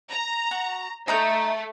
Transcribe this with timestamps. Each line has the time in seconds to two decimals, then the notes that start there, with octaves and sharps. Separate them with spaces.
0.11 A#5
0.51 F#4
1.08 A3 D#4 A#5 G6